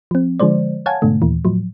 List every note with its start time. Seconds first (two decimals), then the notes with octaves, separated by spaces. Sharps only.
0.11 F3 C4
0.40 D3 F3 G#3 C5 D5
0.86 C#5 F5 F#5 G#5 A5 G#6
1.02 G#2 B2 D3 A3
1.22 D#2 A#2 E3
1.45 A2 F3 F#3